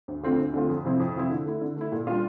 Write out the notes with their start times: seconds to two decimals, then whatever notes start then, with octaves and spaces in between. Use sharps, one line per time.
0.08 D2
0.23 D3 A3 C4 F4
0.39 D2
0.54 D3 A3 C4 F4
0.69 F2
0.85 C3 F3 C4 E4
1.00 F2
1.15 C3 F3 C4 E4
1.31 D3
1.46 A3 E4
1.61 D3
1.76 A3 E4
1.92 A#2
2.07 G3 D4 F4